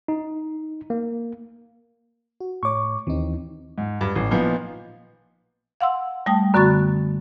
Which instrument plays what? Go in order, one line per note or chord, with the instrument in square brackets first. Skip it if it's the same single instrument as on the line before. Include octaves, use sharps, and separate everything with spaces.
[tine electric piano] D#4
A#3
[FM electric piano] F#4
[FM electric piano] A2 C#5 [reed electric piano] C#6 D6
[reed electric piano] D#2 C4 [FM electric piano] E3 D#4
[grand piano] G#2
G2
A1
A#2 F3 B3 D#4
[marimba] F5 F#5 C6 E6
G3 A3 G5 A5 D#6
F#2 D3 B3 F#4 C#6 A6